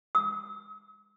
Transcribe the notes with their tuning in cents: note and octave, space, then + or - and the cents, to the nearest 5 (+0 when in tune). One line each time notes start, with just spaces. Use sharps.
D#6 +45